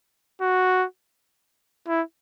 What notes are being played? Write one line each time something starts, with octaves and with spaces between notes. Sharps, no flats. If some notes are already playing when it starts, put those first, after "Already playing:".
F#4
E4